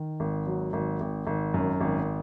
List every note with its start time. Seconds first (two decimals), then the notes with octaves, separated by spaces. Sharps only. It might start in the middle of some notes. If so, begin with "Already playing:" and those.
Already playing: D#3
0.20 G#1
0.47 F#3
0.73 G#1
1.01 G#1
1.27 G#1
1.54 F#2
1.81 G#1